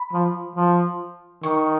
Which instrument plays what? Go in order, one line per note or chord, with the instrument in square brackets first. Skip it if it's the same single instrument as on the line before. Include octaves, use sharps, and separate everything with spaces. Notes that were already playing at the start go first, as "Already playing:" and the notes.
Already playing: [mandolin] B5
[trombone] F3
F3
[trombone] D#3 [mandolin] C#6